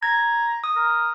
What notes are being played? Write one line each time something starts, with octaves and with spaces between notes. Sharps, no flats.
A#5 G#6
D#6
A#4